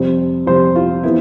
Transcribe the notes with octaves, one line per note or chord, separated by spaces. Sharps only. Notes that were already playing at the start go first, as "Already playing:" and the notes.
Already playing: F2 C3 G3 C4
F2 C3 G3 C4 C5
F4
E3 B3 E4